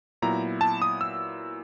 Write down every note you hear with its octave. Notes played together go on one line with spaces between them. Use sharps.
A#2 F#3 B3 E4 A#5
A5
D#6
E6